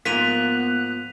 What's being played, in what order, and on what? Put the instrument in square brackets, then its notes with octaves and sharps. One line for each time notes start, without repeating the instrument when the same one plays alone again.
[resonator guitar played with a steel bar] G#2 F3 A#3 [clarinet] B3 [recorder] F#6 [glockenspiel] B6 D#7 F7